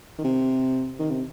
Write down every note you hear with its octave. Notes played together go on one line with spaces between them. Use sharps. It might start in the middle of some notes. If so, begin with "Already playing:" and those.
D#3
C3
D#3
C3